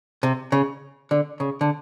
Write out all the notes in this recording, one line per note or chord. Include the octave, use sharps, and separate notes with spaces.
C3
C#3
D3
C#3
D3